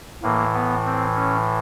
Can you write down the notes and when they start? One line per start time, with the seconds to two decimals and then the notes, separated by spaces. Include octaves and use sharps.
0.23 A2 E3 A#3
0.53 B3
0.85 C4
1.15 C#4